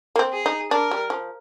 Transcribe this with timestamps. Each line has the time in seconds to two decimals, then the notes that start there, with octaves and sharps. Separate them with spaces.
0.16 A#3
0.19 C4
0.33 G#4
0.46 D#4
0.71 D4 A#4
0.91 G3
1.10 F3